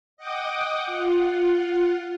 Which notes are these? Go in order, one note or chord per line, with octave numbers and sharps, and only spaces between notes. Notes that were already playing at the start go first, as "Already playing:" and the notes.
D#5 F#5 G5 D6 D#6
F4 F#5